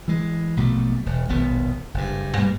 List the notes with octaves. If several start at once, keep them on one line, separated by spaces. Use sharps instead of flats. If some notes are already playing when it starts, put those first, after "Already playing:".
E3 G#3
A#1 B2 F#3 A3
E1
D#1 A#1 B2 B3
F#1 G2
G2 G3 A#3